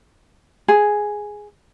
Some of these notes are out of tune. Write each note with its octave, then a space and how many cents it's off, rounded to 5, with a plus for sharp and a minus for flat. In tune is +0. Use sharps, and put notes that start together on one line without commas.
G#4 +0